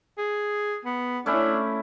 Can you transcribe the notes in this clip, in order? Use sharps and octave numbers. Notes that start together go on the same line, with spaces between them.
G#4
B3
A3 C#4 D4 E4